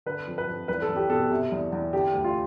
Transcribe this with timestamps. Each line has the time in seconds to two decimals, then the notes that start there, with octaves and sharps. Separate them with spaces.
0.06 D3 B4
0.27 F2
0.38 B4
0.47 F2
0.68 E2 B4
0.82 A4
0.89 E2
0.96 G4
1.10 B2 A4
1.31 C3
1.52 E2
1.72 E2
1.93 D3 G4
2.13 D2
2.24 F4